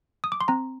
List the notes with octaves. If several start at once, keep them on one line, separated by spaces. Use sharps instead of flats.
D#6
D6
C6
C4 A#5